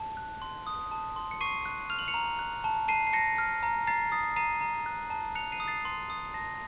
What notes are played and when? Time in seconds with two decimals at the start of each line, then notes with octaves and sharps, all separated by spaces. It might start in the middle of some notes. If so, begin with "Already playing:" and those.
Already playing: A5
0.17 F#6
0.42 C6
0.67 D#6
0.91 A5
1.16 C6
1.31 C#7
1.41 C#6 C7 D#7
1.66 F#6
1.90 F6 F7
1.99 F#7
2.08 C#7 F7
2.14 A#5
2.39 F#6
2.64 A5
2.88 A5 C7 D#7
3.07 C7
3.13 A5 A#6 C#7
3.38 F6
3.63 A#5
3.87 A#5 A6 C7
4.12 D#6 A6 C7
4.36 A#5 C7 D#7
4.61 A#5
4.86 F#6
5.10 A5
5.35 F#6 C#7 F7
5.52 C7 D#7
5.60 D#6
5.68 A6 C7
5.85 C6
6.10 D#6
6.34 A5 A#6